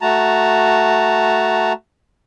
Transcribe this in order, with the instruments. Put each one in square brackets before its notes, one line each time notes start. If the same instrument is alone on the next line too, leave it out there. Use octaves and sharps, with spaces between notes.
[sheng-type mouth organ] A3 F#4 A5 A#5